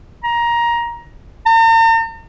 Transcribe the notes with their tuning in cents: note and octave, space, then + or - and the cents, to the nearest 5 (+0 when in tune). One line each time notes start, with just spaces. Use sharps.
A#5 +15
A#5 -45